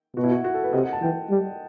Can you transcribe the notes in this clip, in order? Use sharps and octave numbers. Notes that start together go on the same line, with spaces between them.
B2 F#4
E4
F#4
F#4
A4
B4
C3 D#5
F#5
A5
E3 G5
G3